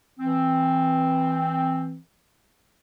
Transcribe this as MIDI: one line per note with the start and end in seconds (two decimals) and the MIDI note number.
0.19 1.96 52
0.19 1.96 60